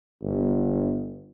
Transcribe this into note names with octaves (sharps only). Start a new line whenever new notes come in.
G1